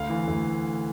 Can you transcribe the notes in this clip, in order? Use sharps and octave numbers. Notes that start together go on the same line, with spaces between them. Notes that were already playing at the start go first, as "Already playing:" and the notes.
Already playing: D2 F5
E3
D2